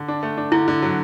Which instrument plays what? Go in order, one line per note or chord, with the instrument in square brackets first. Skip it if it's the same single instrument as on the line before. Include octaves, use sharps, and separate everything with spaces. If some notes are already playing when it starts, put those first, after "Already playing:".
Already playing: [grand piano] D3
D4
A3
D4
[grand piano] D3 [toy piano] E4
[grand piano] D3
F#3